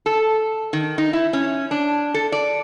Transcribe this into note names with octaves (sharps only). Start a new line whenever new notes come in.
A4
D#3
D#4
E4
C#4
D4
A4
D5